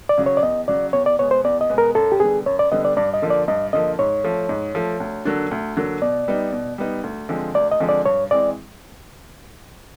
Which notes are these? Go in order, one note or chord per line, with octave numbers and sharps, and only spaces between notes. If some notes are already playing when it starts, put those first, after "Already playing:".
D5
C#3 F#3
C#5
D5
E2 D#5
C#3 F#3 D5
E2 C#5
D5
B2 G#3 B3 C#5
C5
E2 D5
D#5
B2 G#3 B3
A#4
F#2 A4
G4
D3 G3 B3 G#4
F#2 C#5
D5
D3 G3 B3 D#5
D5
G2 D5
D#5
D3 F3 A#3
D5
G2 D#5
D3 F3 A#3 D#5
G#2 C#5
F3 A3
G#2
F3 A3
D2
D3 F#3 A#3 D4
D2
D3 F#3 A#3 D4
B2 D5
G3 B3 D#4
B2
G3 B3 D#4
D2
D3 F3 G#3 C4
D2 D5
D#5
D3 F3 G#3 C4
D5
G2 C#5
E3 G#3 C4 D5